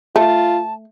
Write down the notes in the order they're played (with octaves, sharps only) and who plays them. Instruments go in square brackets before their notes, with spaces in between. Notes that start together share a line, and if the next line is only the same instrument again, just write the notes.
[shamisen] A3 [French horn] F4 [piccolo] A5